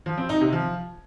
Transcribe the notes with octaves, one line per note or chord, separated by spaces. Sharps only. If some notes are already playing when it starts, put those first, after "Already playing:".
F3
C4
D#4
C3
F3